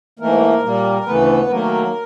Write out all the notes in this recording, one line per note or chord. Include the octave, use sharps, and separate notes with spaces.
G#2 E3 A3 A#3 A#4
A#2 G3 A#3
D2 C#3 E3 A3 B3 B4
D#3 F#3 A3 A#3 A#4